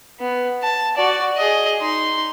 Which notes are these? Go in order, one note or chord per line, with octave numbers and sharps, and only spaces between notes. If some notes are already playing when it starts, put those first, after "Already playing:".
B3
A5
F#4 D5
G#4 D#5
D#4 C6